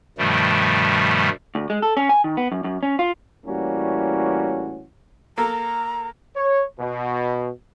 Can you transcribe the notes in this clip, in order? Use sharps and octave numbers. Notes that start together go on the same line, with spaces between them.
G2 B2 D#3 F3 G3 A3
D2
G#3
A4
C#4
G#5
D#3
B3
F#2
F#2
C#4
F4
A2 E3 G3 A#3 C#4 F#4
A#3 A4 A#5
C#5
B2